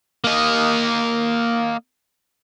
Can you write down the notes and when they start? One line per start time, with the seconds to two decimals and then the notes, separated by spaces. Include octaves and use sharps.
0.24 A#3 D#5